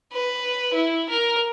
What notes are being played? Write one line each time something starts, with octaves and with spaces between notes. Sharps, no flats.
B4
E4
A#4